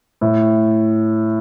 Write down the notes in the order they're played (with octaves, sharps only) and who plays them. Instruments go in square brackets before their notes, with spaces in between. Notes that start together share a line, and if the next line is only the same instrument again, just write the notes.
[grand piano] A2